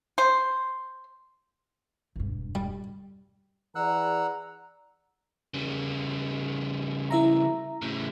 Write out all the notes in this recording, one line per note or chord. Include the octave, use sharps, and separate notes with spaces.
C5
E1 G2
G3
E3 G#4 D5 F#5 A#5 E6 F#6
C#3 G3
E4 E5 A#5
A2 C#3